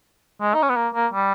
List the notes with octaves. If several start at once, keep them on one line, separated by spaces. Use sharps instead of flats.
G#3
D#4
C#4
B3
A#3
A#3
G3